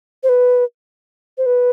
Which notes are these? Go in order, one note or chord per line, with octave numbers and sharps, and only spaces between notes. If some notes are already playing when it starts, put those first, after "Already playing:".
C5
B4
C5
B4